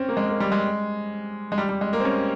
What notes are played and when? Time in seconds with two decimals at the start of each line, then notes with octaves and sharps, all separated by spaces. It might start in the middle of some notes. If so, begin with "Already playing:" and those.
Already playing: C4 C#4
0.09 A#3
0.17 G#3
0.29 A#3
0.40 G3
0.52 G#3
1.52 G#3
1.58 G3
1.69 G3
1.81 G#3
1.93 A#3
2.00 C4
2.05 C#4